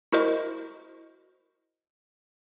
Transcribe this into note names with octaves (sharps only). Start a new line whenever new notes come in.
E4 F#4 A#4 C5 D#5 C#6